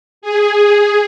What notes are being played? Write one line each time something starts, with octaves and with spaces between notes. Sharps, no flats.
G#4